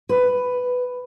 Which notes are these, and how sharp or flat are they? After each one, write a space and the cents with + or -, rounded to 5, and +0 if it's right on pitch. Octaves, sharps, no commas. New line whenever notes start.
B4 +10